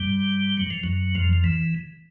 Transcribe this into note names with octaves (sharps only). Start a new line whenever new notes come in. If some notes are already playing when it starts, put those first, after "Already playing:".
Already playing: G2 G3
F#3
F3
F#2 F#3
F2 F3
F3
E3